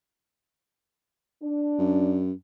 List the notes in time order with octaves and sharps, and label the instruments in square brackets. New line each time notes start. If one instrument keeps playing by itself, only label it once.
[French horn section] D4
[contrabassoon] F#2